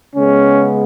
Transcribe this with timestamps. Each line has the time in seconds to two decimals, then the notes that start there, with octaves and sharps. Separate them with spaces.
0.16 C#3 G#3 B3 C#4